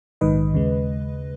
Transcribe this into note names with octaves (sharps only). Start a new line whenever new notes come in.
A#1 G#2 D#3 B4 D#5
D#2 C#3 G#3